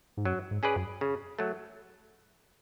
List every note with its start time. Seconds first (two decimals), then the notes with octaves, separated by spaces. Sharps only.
0.17 G#2
0.25 F#2 F#3
0.51 G#2
0.63 C#4 G#4 B4 D5
0.76 F#2
1.01 C#3
1.39 F#3 A3